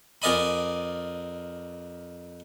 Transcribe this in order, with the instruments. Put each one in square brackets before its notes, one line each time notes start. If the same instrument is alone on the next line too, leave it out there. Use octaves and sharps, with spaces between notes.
[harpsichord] F2 A#4 D5 D#5 G#5 B5